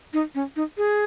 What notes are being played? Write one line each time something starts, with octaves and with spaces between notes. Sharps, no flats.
D#4
C#4
D#4
G#4